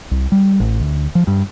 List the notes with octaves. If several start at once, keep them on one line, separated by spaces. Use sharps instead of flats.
C2
G3
A1
D2
F3
G2